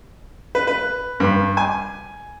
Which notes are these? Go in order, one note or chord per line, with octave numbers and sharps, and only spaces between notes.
B4
B4
G2
G#5